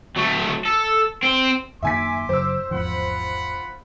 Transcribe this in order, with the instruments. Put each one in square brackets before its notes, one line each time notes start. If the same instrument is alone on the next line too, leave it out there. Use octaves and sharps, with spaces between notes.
[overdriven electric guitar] F#3 A3
A4
C4
[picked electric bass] F#2 D#3 A#3 [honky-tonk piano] E5 G#5 B6 [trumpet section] C6 D6
[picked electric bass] F#2 C#3 [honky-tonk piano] C5 E6
[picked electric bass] G#1 E2 F3 [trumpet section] F4 F#5 B5